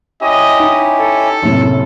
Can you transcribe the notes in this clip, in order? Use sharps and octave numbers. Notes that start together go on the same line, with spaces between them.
C#4 E4 G4 D#5
D#4
A4
F#1 A2 C3